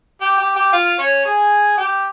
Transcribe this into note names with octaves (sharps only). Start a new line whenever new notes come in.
G4 G5
G4 G5
G4 G5
F4 F5
C#4 C#5
G#4 G#5
G4 G5